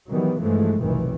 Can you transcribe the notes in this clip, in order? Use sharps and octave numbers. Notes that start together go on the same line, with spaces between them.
D#3 E3 F#3 G3 B3
G2 E3 F3 G#3 A3
F1 B1 G#2 D#3 E3